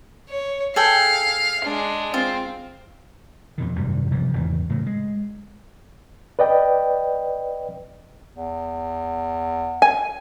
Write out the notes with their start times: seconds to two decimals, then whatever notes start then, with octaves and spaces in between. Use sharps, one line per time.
0.29 C#5
0.76 G#4 A4 F5 G5
1.65 G#3 D4
2.14 C4 F4
3.58 F2 B2 D#3
3.76 G#1 F#2 C3 G3
4.11 B1 C3 E3 F3
4.33 G#1 E2 C#3 E3
4.69 A2 C#3 F#3
4.86 G#3
6.39 B4 D5 D#5 G5
8.31 E2
9.82 G#5